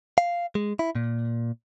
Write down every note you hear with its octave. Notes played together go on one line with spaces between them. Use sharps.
F5
G#3
E4
A#2